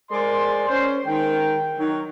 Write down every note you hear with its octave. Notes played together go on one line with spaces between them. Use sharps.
G#3 G#4 A#4 C5 D5 C6
C#4 C5
D#3 G#3 A#4 G5
D#3 F#3